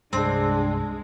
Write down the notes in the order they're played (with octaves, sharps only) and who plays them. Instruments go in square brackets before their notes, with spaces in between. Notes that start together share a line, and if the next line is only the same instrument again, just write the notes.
[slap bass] C2 G2 G3 [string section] G#3 [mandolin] C4 [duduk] D4